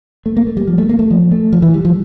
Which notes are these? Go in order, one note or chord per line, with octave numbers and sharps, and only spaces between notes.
A3
A#3
A3
G3
F3
A3
A#3
A3
F3
A3
F3
E3
G3
F3